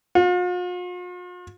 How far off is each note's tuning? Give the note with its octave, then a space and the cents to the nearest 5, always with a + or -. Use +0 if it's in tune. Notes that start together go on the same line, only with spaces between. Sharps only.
F4 +45